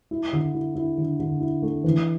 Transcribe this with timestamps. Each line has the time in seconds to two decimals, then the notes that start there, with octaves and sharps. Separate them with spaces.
0.11 E4
0.33 D3
0.54 E4
0.75 E4
0.98 D3
1.19 D3
1.41 E4
1.62 A3
1.84 E3